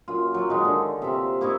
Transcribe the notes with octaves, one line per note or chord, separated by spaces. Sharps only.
F#2 F4
F#3 F4
D#3 G#3 D#4
D3
C3 E5 F5
A#3 E4 C#5 D#5